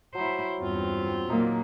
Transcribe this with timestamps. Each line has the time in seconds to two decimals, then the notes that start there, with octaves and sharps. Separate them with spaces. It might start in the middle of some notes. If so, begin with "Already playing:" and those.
0.15 F#3 E4 C5
0.61 E2 G2 C4 F4
1.29 A#2 F#3 A#3 D#4